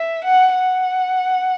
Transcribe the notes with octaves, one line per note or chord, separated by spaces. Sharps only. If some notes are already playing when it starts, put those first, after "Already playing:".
Already playing: E5
F#5
F#5